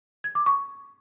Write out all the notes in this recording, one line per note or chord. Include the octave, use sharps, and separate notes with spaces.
G#6
D6
C#6